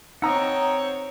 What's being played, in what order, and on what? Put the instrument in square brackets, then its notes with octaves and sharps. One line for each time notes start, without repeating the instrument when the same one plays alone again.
[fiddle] C4 C#5 [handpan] D#4 [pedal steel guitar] F#5 D#6 [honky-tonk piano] A#5 E6